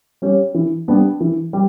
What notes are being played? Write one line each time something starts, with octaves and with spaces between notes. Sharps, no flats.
G3 C#4 G4
E3
G3 B3 D4
E3
G3